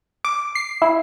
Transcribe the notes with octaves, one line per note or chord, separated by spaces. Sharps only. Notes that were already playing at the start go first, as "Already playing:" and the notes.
D6
C7
E4